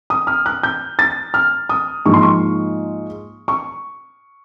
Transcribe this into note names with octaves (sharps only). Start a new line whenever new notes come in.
D#6
F6
F#6
G6
A6
F6
D#6
G#2 F3 A#3 C#6
C6
C#6
C#6